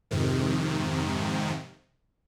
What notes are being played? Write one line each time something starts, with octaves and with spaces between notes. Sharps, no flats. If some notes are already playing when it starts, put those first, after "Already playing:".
F2 G#2 C3 D#3